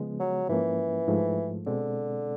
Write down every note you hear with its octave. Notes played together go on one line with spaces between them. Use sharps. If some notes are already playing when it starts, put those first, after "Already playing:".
Already playing: C#3 F3 G#3 B3
F#3
G#2 E3 F3 A#3 C#4
G#2 F3 A3
B2 D3 G#3 C4